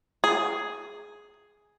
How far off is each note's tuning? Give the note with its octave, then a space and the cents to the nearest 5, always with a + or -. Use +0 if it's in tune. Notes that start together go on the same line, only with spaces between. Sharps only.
G#4 +5